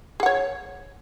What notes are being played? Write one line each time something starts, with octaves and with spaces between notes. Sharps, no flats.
G#4 C#5 F#5